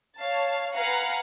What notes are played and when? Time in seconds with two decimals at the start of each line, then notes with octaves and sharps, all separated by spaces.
0.20 C#5 F5 A5
0.74 B4 F5 F#5 G#5 A#5 C#7